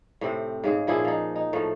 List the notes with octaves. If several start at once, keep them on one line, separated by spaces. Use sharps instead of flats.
A2 C3 C4
G#2 C#3 G#4
A#2 F3 E4 G#4
F3 D#4
D#4
A2 F3 A3